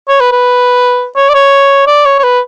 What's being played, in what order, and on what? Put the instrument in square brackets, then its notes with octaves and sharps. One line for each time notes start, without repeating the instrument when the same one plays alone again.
[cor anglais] C#5
B4
B4
C#5
D5
C#5
D5
C#5
C#5
B4